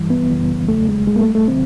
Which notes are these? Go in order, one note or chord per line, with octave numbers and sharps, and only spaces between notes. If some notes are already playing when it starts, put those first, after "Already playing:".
Already playing: G2 E3 G3
B3
F#2 C#3 E3 G3
E2 C#3 F#3 A3
G#3
A#2 G3 G#3
A#3
A3
A3
C3 D#3 F#3 C4